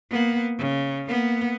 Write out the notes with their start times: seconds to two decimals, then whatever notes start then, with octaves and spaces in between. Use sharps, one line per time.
0.11 A#3 B3
0.59 C#3
1.09 A#3 B3